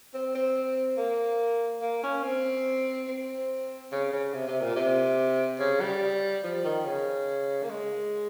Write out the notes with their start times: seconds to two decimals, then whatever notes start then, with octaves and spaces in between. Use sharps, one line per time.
0.14 C4
0.35 C4
0.98 A#3
1.82 A#3
2.03 C#4
2.23 C4
3.08 C4
3.92 C#3
4.13 C#3
4.34 C3
4.48 C3
4.62 A#2
4.76 C3
5.59 C#3
5.81 G3
6.44 F3
6.64 D#3
6.85 C#3
7.63 A#3
7.70 G#3